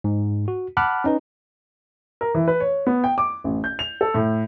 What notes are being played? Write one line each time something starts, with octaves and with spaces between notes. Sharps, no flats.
G#2
F#4
F#5 A5 B5 D6 F6 F#6
C#4 D#4 B4
A#4
E3
B4
C#5
B3
G5
D6
A1
G6
F7
A4
A2